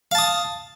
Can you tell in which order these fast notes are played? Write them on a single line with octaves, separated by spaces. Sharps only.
F5 A5 D#6